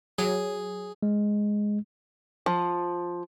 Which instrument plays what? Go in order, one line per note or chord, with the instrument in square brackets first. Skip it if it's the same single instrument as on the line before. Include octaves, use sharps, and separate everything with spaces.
[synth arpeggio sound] F#3 [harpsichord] G#4
[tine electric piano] G#3
[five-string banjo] F3